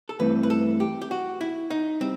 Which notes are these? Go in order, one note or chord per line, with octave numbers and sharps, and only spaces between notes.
A4
G2 E3 A3 C4 B4
B4
A4
G4
G4
F#4
E4
D#4
G3 C4 D#4